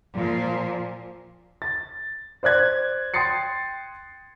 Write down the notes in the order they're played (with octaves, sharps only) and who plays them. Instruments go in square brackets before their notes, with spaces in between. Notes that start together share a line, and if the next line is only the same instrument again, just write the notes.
[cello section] A#2 F3
[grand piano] A6
C5 D5 F#6 G#6
G5 C6 D#6 A6 C7 C#7